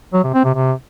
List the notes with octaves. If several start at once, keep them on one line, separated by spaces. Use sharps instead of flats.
F#3
C3
C4
C3
C3